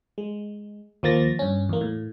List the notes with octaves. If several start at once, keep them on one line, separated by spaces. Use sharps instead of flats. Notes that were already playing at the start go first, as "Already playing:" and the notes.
G#3
D#2 F3 A#3 A6 A#6
G2 C#4
E2 A#3
A2